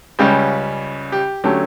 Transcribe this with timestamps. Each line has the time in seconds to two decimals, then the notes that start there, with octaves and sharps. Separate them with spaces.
0.19 C#2 C#3 G3 C#4 G4
1.12 G4
1.44 D3 F#3 A3 C#4 G4